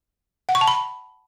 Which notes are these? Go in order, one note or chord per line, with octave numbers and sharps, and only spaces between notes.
F#5
C#6
A5
B5